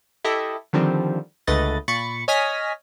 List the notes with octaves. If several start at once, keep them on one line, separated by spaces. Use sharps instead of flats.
E4 G4 A4 D#5 E5
D3 D#3 F3 G3 C4
C#2 D3 A3 B4 D#5 A6
A#2 B5 C#6 A6 C#7
C#5 D#5 G#5 F6 A#6 B6